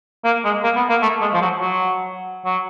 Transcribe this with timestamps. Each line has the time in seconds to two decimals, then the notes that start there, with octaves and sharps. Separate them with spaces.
0.24 A#3
0.44 G#3
0.63 A#3
0.76 B3
0.89 A#3
1.02 A3
1.21 G#3
1.33 F3
1.41 F#3
1.60 F#3
2.45 F#3